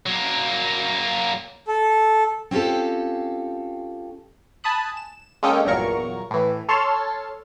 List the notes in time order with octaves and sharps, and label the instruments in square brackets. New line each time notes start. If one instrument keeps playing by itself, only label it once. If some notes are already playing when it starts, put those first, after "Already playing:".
[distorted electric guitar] F#3 A#3
[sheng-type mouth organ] A4
[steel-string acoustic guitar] C4 C#4 F4 G4 A4
[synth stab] G#5 A5 B5 D#6 F#6
E7
G#3 A#3 C#4 A4 D#5 G5
G1 E2 A#2 F#3 A#4 C#6
A2 E3
A4 C#5 A5 C6 E6 F6